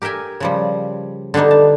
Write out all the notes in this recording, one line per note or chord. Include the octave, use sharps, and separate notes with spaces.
G4 A#4 E5 G5 G#5
C#3 F3 G3
D3 G3 B3 D4 D#4
A5